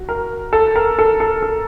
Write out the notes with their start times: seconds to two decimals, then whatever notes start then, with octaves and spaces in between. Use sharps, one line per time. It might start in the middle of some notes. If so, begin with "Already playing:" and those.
Already playing: F#4
0.09 A#4
0.53 A4
0.76 A#4
0.99 A4
1.20 A4
1.42 A4